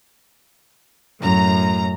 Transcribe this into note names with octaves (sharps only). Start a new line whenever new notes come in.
F#2 A2 A#5